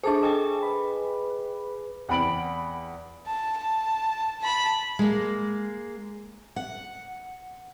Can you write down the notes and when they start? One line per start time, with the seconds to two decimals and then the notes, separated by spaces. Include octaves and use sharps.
0.04 D4 G#4 A4 C5 A5 C#6 D6
0.23 D#5 G5 G#5
0.63 B4 B5
2.09 E2 F#5 G5 B5 D7 F#7
3.27 A5
3.58 A5
4.41 A5 B5
4.99 G#3 A#3
6.56 F#5